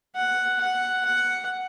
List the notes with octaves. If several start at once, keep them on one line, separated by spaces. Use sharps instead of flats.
F#5
F#5
F#5